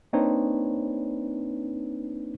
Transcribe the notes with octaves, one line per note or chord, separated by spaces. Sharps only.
A#3 C4 D4 D#4 B4 C#5